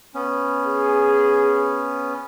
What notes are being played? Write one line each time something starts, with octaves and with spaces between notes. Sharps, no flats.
B3 C#4
G#4